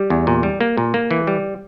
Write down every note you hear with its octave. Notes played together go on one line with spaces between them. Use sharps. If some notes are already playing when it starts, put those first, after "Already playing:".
Already playing: G3 G4
E2
A#2
G3
A#3
A#2
A#3
E3
G3